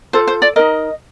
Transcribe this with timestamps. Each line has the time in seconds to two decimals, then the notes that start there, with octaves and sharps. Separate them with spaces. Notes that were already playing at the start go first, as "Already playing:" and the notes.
0.13 F4 A4 C5
0.27 C5
0.42 D5
0.56 D#4 A#4 D#5